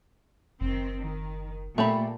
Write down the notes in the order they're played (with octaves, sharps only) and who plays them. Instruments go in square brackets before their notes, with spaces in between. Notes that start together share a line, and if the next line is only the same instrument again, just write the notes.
[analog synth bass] F#1 [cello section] D#3 C4
[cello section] D#3
[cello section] A#2 [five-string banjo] A3 G4 B5